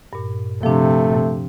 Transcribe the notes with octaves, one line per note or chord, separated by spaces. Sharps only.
G2 A#2
C3 F3 A3 D4